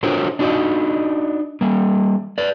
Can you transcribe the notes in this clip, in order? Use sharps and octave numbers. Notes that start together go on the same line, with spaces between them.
D4 F4 F#4 A#4 C5 C#5
D4 D#4 F#4 C5 D5 D#5
G3 A#3
B4 D5